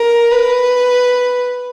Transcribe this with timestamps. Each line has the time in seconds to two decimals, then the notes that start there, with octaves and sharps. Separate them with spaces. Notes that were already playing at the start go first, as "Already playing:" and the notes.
Already playing: A#4
0.33 B4